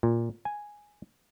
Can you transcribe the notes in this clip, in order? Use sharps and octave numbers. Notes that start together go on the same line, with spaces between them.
A#2
G#5